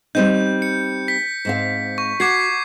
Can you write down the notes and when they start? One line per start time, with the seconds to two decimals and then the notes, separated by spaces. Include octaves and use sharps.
0.15 G3 C4 D#4 G6
0.62 C#7
1.08 B6
1.45 G#2 C4 F5
1.98 C#6
2.20 F#4 D6 G#6 C7